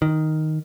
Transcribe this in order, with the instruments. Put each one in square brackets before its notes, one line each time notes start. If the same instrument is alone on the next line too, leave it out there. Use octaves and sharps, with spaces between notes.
[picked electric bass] D#3